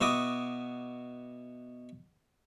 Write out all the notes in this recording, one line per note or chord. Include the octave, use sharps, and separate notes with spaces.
B2 E4 F#4 D6 D#6